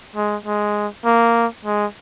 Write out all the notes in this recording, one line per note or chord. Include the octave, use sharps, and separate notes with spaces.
G#3
G#3
A#3
G#3